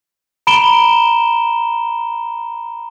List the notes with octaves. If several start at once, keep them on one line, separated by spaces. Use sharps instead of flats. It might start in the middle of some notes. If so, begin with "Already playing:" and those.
A#5 B5 D7 E7 G7